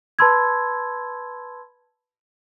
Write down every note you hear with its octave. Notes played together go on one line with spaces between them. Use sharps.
B4 A5 B5 C6 E6 G#6